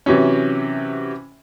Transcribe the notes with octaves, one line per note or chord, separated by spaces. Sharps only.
C3 E3 F#3 C#4